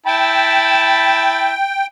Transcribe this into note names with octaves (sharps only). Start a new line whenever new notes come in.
E4 G5 A5 B5